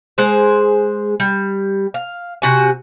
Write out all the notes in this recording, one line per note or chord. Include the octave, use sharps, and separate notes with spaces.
G#3 G#4 C5
G3
F5
C3 F#4 G#5